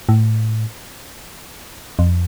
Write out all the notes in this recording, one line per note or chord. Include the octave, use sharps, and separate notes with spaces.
A2
F2